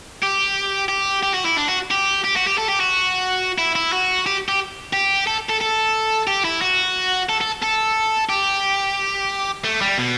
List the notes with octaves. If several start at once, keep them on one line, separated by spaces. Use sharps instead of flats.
G4
G4
G4
F#4
E4
D4
F#4
G4
G4
F#4
G4
A4
G4
F#4
E4
E4
F#4
G4
G4
G4
A4
A4
A4
G4
E4
F#4
A4
A4
A4
G4
A3
G3
B2